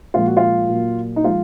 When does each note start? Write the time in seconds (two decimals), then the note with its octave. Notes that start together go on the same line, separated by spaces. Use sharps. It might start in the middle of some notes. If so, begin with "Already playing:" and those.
0.14 A#2 F3 G#3 F4
0.26 F#4
0.37 F4
0.69 A#2 F#3 A#3
1.16 D#4
1.24 F3 G#3 F4